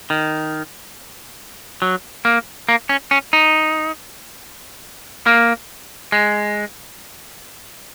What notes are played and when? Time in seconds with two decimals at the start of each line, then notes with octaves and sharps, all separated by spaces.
0.10 D#3
1.82 F#3
2.25 A#3
2.69 A#3
2.89 C#4
3.11 C#4
3.33 D#4
5.26 A#3
6.12 G#3